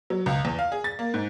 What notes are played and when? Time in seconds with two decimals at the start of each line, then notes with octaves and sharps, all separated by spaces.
0.10 F#3
0.26 C#2
0.45 E2
0.59 F5
0.72 G#4
0.84 A6
0.99 A#3
1.14 G#2